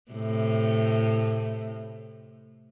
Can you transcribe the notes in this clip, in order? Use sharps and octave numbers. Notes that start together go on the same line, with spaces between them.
A2 C3